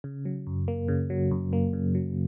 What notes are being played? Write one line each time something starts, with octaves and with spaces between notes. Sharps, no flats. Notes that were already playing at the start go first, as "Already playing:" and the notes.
C#3
F#3
F#2
A#3
C#3
F#3
F#2
A#3
C#3
F#3